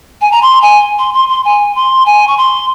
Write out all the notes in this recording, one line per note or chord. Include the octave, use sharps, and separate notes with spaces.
G#5
A#5
C6
G#5
C6
C6
C6
G#5
C6
G#5
C#6
C6